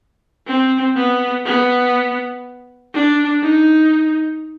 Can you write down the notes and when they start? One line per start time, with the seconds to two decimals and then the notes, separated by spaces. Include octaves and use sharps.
0.47 C4
0.96 B3
1.46 B3
2.94 D4
3.43 D#4